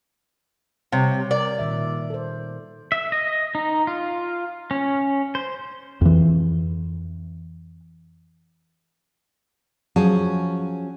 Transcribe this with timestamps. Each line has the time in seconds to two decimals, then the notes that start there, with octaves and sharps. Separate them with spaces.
0.92 C3 G3 C#5
1.31 A#4 D5
1.59 A#2 D#3 E5
2.10 A4 C5
2.92 E5
3.12 D#5
3.55 D#4
3.87 F4
4.71 C#4
5.35 C5
6.01 F2 E3
9.96 F3 F#3 C#4 G#4 A5